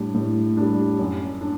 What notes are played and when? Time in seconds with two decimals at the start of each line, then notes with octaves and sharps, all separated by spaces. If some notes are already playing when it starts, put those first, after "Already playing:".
Already playing: A2 G3 D4
0.14 A2
0.57 G3 D4
0.99 F#2
1.41 D4